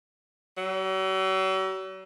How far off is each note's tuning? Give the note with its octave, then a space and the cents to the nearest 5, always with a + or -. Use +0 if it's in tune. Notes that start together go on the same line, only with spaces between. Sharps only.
F#3 +45